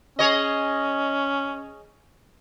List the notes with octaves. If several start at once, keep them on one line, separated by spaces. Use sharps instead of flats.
C#4 G#4 C#5 D#5